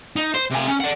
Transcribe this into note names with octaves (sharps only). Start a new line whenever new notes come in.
D#4
C5
C3 G#5
C#4
D5 F#5